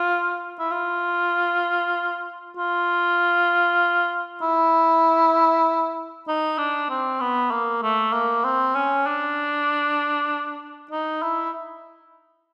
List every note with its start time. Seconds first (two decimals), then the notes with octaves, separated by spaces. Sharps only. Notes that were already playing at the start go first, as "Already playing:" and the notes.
Already playing: F4
0.59 E4
0.71 F4
2.57 F4
4.42 E4
6.28 D#4
6.58 D4
6.89 C4
7.20 B3
7.51 A#3
7.83 A3
8.13 A#3
8.44 C4
8.75 C#4
9.06 D4
10.91 D#4
11.22 E4